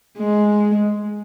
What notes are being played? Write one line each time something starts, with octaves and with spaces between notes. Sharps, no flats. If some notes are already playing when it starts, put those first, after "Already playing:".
G#3